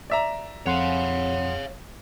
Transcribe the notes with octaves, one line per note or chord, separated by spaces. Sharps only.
D5 E5 A#5
F2 C#5 F5 F#5 C6